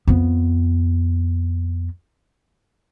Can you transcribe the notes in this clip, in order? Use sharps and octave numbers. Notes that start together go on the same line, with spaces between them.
F2 B3